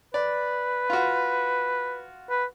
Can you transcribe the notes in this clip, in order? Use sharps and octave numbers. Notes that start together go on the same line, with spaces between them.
B4 D5
F4 F#4
B4